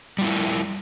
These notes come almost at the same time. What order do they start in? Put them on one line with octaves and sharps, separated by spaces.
G3 F4 E4